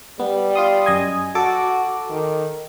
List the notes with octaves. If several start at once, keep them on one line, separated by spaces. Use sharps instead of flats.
G3 B3
F4 C6 D#6
F#2 D#5 G#5
F#4 A4 D6
D#3